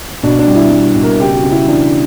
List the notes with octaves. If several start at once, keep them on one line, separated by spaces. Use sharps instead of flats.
B2 D4
D4
G3
E4
G3
B2
A#4
C#3 G4
F#4
C#3
E4
E3 D4